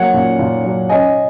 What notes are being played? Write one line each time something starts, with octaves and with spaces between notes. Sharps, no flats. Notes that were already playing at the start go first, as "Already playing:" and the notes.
Already playing: F#3 A#3 C#5 F#5
A#2
A#2
F#3
C#4 D#5 G#5